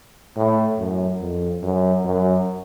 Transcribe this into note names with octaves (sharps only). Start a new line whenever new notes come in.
A2
F#2
F2
F#2
F#2